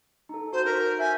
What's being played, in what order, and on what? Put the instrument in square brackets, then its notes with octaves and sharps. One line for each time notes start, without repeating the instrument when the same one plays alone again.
[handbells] D#4 A4
[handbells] F#4 G6 [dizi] C5
[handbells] D#4 B6 [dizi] A#4
[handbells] E5 G6 B6 [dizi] G#5